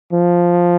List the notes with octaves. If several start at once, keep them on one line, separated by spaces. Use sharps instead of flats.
F3